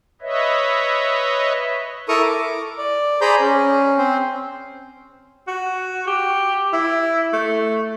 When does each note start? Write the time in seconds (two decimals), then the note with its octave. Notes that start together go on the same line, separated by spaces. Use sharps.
0.22 B4 C#5 D#5 E5
2.09 E4 A4 A#4 A#5 C#6 D#6
2.23 D6
2.78 D5
3.21 G#4 C5 D5 A#5 B5 G6
3.40 C#4
3.98 C4 C5
5.47 F#4
6.07 G4
6.73 E4
7.33 A3